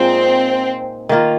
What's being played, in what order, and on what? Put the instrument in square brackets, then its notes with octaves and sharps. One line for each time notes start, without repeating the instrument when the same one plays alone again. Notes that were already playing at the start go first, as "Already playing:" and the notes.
Already playing: [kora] A#2 G#3 D#4 [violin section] C4
[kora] D#3 A#3 F4